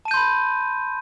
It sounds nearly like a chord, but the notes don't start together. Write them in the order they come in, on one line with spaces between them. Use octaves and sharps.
A5 D#7 G6 C6 B5